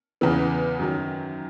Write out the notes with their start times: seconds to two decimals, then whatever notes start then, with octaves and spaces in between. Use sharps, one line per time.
0.21 E2 C#3 E3 B3
0.79 F#2 D#3 F#3